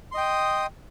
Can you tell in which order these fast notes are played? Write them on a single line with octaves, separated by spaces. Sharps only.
C6 D#5 G5 D#6